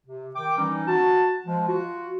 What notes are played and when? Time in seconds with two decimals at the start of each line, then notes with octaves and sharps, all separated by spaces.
0.06 C3
0.35 D#3 G5 D6
0.57 E3 G3 C#4 D#4
0.87 F#4 A5
1.46 F3 G#3
1.68 F4 F#4